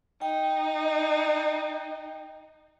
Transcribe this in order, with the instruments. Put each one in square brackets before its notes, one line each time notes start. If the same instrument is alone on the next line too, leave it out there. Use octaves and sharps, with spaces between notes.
[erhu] D#4 [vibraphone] G5